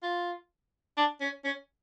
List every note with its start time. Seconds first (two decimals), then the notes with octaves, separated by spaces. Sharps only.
0.03 F4
0.97 D4
1.21 C#4
1.44 C#4